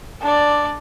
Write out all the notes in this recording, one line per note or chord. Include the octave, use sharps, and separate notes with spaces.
D4 D5